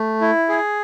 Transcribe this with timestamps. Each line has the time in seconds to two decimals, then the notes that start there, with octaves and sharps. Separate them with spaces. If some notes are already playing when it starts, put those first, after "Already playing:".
Already playing: A3
0.21 E4
0.49 G#4